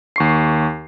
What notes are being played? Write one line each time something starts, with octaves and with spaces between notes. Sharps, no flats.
D#2 C#6 C7